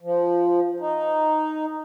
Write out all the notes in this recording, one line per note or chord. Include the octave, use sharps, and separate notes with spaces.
F3
D#4